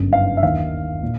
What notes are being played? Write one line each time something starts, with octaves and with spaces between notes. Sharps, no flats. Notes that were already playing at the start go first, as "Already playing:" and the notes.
Already playing: G1 F#2 C#3
F5
E5
D#2 D#3 F5
A#2